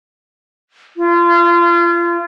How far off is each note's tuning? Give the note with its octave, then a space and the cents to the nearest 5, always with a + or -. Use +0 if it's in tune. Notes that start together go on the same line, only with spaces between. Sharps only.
F4 -30